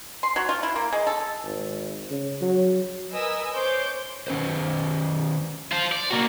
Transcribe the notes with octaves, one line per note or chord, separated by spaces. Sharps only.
C6
F#3
F4
E4
A#3
G#3
A4
G#1
C#3
F#3
A#4 B4 D#5 G#5 E6
C5 C#5 C6 D6 G6
D#3 C#4 B4 C5
F4 C5
D5
A#3 F#4